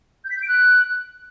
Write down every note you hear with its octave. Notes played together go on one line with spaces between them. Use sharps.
G6
B6
G6
D7
F#6